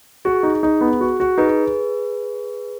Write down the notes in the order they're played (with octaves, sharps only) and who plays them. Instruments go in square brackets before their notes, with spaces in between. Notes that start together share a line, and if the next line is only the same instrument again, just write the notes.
[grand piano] F#4 [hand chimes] G#4
[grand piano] D#4
D#4
B3
F#4
F#4
[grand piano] D#4 [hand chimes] G#4 B4